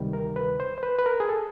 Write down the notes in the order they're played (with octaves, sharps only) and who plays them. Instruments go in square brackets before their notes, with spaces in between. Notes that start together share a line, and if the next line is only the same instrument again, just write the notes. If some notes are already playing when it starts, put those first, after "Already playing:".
Already playing: [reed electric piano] D2 C3 D#3 G3
A#4
B4
C5
C5
B4
B4
A#4
G#4
A4